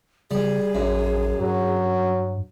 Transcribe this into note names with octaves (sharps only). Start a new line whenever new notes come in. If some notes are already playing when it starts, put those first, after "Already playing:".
C#3 G3 G#4
A1 F#2
G2 F#3